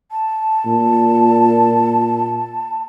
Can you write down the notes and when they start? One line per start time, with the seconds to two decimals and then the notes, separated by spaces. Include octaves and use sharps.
0.12 A5
0.66 A#2